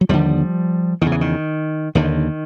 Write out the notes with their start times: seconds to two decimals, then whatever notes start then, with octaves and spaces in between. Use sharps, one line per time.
0.01 F#3
0.09 D#2 D3 F3 G3
1.01 E2 D#3
1.06 C#3
1.12 E3
1.21 D#3
1.95 D#2 D3 D#3